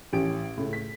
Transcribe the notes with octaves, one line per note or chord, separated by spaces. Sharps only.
A1 C#4 G4 D7
C#2 A2
B6